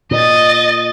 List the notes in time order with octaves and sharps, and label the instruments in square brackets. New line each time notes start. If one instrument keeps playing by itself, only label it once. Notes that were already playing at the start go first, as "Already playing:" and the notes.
[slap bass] A#2 [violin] D#5 A6